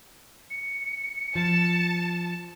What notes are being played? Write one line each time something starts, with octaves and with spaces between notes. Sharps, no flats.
C#7
F3 A5